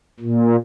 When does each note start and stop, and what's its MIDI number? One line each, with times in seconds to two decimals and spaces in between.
0.20 0.56 46